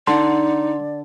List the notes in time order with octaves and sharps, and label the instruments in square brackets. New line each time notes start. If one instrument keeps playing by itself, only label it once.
[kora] D3 F#5 [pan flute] D#4 [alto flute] D5 [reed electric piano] C6